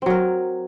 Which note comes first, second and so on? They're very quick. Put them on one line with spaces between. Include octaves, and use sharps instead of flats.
C4 F#3 A#4